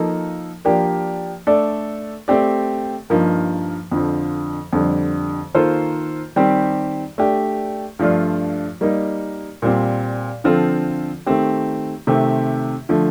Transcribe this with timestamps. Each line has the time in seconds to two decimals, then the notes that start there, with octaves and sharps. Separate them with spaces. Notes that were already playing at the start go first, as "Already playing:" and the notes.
Already playing: F3 A#3 D#4 A4
0.65 F3 A#3 D4 G4
1.47 A3 D4 A4 D5
2.28 A3 C4 G4 D5
3.10 G2 F3 A#3 D#4
3.91 F2 D3 F3
4.73 F2 D3 G3
5.55 D#3 A#3 F4 A4 C5
6.36 D#3 G3 C4 G4
7.18 A3 D4 G4
7.99 G2 F3 A3 D4 F4
8.81 G3 A#3 D#4
9.62 A#2 G3 C4 G4
10.44 D3 F3 C4 F4 A4
11.26 D#3 A3 C4 G4
12.07 C3 D#3 A3 C4 G4
12.89 D3 F3 A3